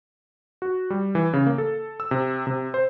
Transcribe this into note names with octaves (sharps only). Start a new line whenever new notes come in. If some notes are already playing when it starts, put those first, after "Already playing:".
F#4
G3
E3
C#3
A#3
A4
E6
C3
C3
C5